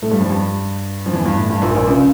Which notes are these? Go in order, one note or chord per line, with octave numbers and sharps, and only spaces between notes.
A2 A3
G2 G3
F2 F3
G2 G3
F3
E2 E3
G2
A2
G2
A#1 A#2
A#1 A#2
C#2 C#3